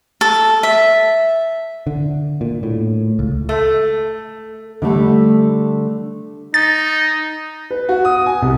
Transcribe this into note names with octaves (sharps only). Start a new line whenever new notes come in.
A4
E5
D3
A#2
A2
C#2
A3
D3 G3 A3
D#4 A6
B4
F#4
D#6
G#5
C2